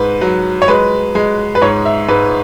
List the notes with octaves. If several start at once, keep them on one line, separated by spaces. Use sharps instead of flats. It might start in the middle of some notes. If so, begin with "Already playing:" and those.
Already playing: G#2 B4
F#3
C#5
G#3 B4
G#3
B4
G#2 C#5
E5
G#2 B4